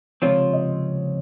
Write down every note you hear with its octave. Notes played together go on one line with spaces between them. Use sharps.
C#2 C3 F3 C4 F4 C#5
D#5